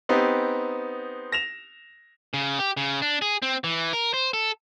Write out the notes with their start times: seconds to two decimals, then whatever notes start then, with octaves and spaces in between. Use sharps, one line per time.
0.09 B3 C4 D#4 G4
1.32 A#6 E7 F7
2.34 C#3
2.59 G4
2.77 C#3
3.02 D4
3.22 G#4
3.42 C4
3.64 E3
3.93 A#4
4.14 C5
4.33 A4